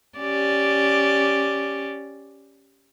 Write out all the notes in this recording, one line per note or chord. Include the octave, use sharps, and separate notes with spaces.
C#4 G4 D5